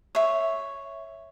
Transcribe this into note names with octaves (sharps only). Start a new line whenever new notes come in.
C#5 E5